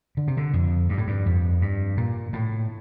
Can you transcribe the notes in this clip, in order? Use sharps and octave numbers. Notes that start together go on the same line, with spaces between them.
D3
C3
D3
F2
G2
A2
G2
F2
G2
A#2
A2